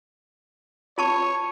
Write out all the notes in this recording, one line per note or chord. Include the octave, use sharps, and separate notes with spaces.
F4 C#5 A5 C#6